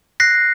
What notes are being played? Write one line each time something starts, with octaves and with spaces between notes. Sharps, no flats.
F#6 A#6 C7